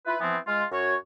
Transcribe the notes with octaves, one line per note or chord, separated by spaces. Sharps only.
E4 F4 B4
E3 F3 B3 C4
G#3 F4
F#2 F#4 C#5